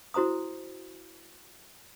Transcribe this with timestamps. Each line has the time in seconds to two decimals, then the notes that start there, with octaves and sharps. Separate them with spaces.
0.14 E4 F#4 C5 A#5 D#6